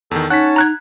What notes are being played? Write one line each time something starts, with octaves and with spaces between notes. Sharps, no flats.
E2 D#3 A4
C#4 D#4 C#5 F#5 A5 F#6 B6
A#5 F#6 G#6